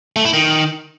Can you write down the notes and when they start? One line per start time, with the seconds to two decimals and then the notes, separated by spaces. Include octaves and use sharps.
0.16 A3
0.25 E4
0.33 D#3